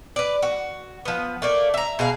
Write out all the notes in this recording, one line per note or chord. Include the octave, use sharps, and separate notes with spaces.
B4 D5
F#4
F3 B3
A3 A#3 D5
E5 A#5
B2 G#4 F5